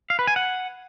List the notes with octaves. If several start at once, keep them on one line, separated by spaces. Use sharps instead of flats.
F5
B4
G#5
F#5